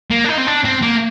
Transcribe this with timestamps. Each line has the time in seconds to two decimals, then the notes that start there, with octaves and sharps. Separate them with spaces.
0.11 A#3
0.25 D4
0.29 D#4
0.38 C4
0.47 D4
0.65 C4
0.83 A#3